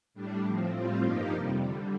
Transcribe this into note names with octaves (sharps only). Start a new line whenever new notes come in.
A2 G3 D4
A2 F3 C4
A2 G3 C4 F4
G2 F3 A#3 D#4 G4
F2 C3 G3
F2 D3 G3